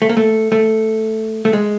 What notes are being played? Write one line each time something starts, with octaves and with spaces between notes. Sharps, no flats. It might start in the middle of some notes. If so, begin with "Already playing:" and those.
A3
A#3
A3
A3
A3
G#3